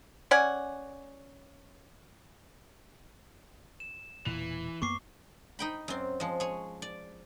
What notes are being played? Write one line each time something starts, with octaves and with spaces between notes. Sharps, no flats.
C#4 D5 F#5 G#5
E7
E1 A#2 E3
F#2 A#3 B3 C#6 D6 C7
D#4 G5 B5
F#2 C4
F3 G#3
G#4 C#5
D5